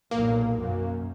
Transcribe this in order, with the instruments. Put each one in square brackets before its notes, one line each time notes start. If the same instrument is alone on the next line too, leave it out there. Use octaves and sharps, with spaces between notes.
[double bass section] B1 A#2 [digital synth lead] A#3
[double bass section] F#2